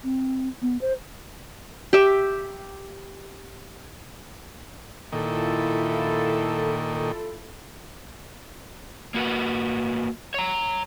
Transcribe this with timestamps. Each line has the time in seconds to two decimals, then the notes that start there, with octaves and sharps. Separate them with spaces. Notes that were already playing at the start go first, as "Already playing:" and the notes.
0.03 C4
0.62 B3
0.81 C5
1.93 G4 E5
5.12 A#2 D#3 E4 F4 A4
9.14 A#3 F#4 B4
10.34 C#5 A#5